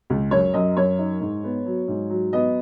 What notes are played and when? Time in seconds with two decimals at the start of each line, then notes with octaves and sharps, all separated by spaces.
0.10 C#2
0.31 F#2 C#5
0.54 F#2 D#5
0.77 F#2 C#5
0.99 D#4
1.21 G#2
1.44 B3
1.66 F#3
1.88 G#2
2.10 F#3
2.33 B3 D#5